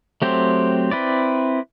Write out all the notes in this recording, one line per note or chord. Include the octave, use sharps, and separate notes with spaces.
F#3 A3 C4 G4 C5
C4 E4 B4 D5